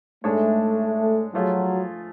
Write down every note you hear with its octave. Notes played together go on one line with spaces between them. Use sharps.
G#2 G#3 A3 D4 G#4 C#5
F3 F#3 A3 F4 G#4